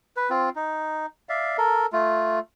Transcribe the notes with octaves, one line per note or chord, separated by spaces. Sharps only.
B4
C4 F4
D#4
D5 E5 F5
A4 A#4
A3 F4